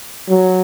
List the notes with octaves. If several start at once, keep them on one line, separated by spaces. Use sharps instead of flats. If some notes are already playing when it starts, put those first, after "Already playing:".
F#3